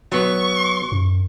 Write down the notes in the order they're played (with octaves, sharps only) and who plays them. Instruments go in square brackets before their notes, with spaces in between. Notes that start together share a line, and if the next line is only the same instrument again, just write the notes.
[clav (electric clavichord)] F#3 B3 [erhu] C#6
[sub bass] F#2